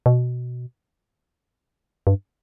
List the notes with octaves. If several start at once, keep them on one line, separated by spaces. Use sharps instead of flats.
B2
G2